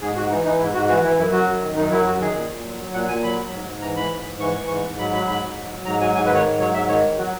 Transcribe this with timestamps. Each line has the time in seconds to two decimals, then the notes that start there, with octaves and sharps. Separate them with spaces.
0.01 G#2 G#4
0.15 G#2 F#4
0.30 E3 D#4
0.44 E3 D#4
0.59 G#2 E4
0.74 G#2 F#4
0.88 E3 F#4
1.03 E3 E4
1.17 F#2 E4
1.32 F#3 F#4
1.47 F#2
1.62 D#3
1.76 F#2 D#4
1.91 F#3 E4
2.06 F#2 F#4
2.20 D#3 G#4
2.34 A#2
2.50 A#2
2.65 F#3
2.79 F#3
2.93 A#2 F#5
3.08 A#2 G#5
3.23 F#3 B5
3.37 F#3
3.52 G#2
3.67 G#2
3.82 E3 A#5
3.96 E3 B5
4.11 G#2
4.26 G#2
4.40 E3 C#6
4.54 E3
4.67 G#2 C#6
4.84 G#2
4.98 F#3 B5
5.13 F#3 B5
5.27 G#2 B5
5.42 G#2
5.57 F#3
5.71 F#3
5.86 G#2 A#5
6.00 F#3 G#5
6.15 G#2 G#5
6.25 B4
6.30 D#3 C#5
6.45 G#2
6.60 F#3 C#5
6.74 G#2 E5
6.89 D#3 C#5
7.03 E2
7.18 F#3 F#4